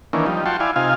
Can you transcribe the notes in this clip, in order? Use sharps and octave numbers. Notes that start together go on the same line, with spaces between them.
D#3 E3 A#3 C#4 D4
F3 G3 D#4
F4 F#4 G5 A5 C6 C#6
E4 D5 F5 G#5
C3 D#4 F4 F5 G#5